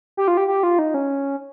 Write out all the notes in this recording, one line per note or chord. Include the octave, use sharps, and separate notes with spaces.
G4
F4
G4
G4
F4
D#4
C#4